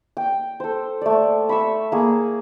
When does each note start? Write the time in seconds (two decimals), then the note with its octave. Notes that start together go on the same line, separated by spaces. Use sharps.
0.17 G5
0.60 A4 C5
1.01 A3 D5
1.49 B5 C#6 E6
1.92 A#3 G#4